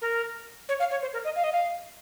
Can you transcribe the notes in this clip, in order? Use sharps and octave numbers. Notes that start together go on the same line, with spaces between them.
A#4
C#5
F5
C#5
C5
A#4
D#5
F5
D#5
F5